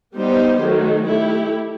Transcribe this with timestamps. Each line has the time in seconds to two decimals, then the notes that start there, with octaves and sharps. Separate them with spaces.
0.15 G3 B3 D#4 G4 C5
0.61 D#3 F#3 A3
1.07 A3 E4 G4